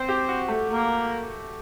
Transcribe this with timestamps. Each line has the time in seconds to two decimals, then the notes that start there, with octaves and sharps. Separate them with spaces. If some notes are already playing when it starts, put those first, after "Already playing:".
Already playing: C4 C5
0.09 G4
0.29 F#4
0.48 A3
0.68 A#3 A#4